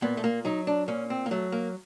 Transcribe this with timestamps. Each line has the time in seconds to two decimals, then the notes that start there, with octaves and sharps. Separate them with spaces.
0.02 A#2 B3
0.17 A3
0.24 A#3
0.45 F#3 D#4
0.67 D4
0.88 A#2 C#4
1.10 C4
1.26 A#3
1.31 F#3 A3
1.52 A#3